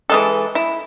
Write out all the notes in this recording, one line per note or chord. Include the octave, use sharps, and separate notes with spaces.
E3 G#3 A4
E4